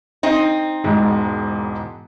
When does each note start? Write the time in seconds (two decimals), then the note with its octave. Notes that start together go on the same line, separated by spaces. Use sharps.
0.23 C4 D#4
0.84 E1 G#2 G#3